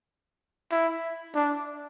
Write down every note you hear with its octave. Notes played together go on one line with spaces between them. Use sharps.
E4
D4